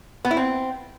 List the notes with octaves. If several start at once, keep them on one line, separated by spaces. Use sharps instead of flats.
B3
E4
C4